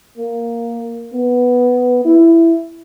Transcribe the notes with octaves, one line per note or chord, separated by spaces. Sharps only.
A#3
B3
E4